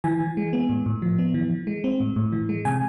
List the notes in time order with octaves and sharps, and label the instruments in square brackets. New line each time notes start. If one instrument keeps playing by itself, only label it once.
[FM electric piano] E3 G#5
E3
G#3
B3
A2
A2
F3
B3
E3
E3
G#3
C4
A2
A2
E3
G#3
C3 G#5